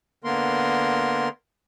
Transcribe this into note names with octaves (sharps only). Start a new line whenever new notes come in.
D3 A#3 B3 A#4 C6